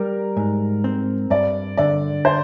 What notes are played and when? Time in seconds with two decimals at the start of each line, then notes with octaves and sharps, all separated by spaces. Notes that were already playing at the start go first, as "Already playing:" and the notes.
Already playing: G3 A#4
0.37 G#2
0.84 C4
1.30 G2 D5
1.77 D3 D5
2.25 C5